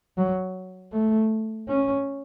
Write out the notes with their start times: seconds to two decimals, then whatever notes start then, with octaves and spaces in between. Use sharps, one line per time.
0.17 F#3
0.93 A3
1.68 C#4